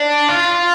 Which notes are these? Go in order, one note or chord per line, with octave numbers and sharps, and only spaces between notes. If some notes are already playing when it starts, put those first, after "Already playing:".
Already playing: D4
F4